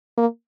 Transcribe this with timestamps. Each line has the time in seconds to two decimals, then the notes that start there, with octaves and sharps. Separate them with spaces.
0.18 A#3